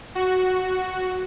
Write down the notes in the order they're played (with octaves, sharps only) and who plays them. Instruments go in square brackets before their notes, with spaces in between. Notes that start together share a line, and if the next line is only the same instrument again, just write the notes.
[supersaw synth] F#4